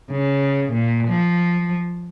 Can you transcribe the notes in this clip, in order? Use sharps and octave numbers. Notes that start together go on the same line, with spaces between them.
C#3
A#2
F3